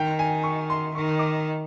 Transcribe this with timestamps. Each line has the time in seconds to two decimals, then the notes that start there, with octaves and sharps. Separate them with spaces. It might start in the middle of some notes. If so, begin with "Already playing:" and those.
Already playing: D#3 G5
0.19 G#5
0.43 C#6
0.70 C6
0.95 D#3 C#6
1.19 D6